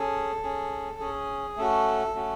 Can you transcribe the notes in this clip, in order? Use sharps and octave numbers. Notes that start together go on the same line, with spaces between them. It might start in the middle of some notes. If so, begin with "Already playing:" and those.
Already playing: C#4 G#4 A4
C#4 G#4
C#4 G#4
A3 C#4 F#4 A4
A3 C#4 F#4